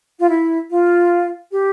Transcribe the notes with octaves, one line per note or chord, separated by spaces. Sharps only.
F4
E4
F4
G4